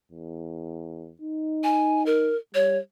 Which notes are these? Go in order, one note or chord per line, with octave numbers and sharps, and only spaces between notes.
E2
D#4
G#5
A#4
G3 C#5